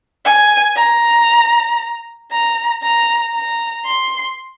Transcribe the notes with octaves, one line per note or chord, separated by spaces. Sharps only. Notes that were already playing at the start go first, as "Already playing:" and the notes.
G#5
A#5
A#5
A#5
A#5
C6